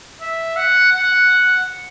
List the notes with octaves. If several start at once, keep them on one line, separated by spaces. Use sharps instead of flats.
E5
F#5
F#5